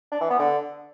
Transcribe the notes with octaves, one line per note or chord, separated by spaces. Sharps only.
D4
E3
B3
D3